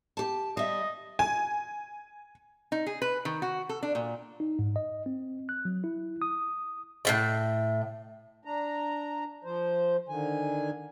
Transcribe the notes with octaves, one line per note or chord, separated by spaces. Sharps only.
G4 A5
G3 D#5 E5
G#5
D#4
G#4
B4
D#3
F#4
A4
D4
A#2
D#4
G#2
D#5
C4
F#6
F#3
E4
D#6
A2 C#3 A5
D4 A#5
F3 C5
D3 D#3 G#5